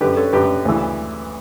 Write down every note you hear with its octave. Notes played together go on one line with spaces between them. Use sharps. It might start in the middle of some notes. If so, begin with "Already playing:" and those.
F#2 D3 G4 B4
A4 C#5
F#2 D3 G4 B4
D2 C#3 E3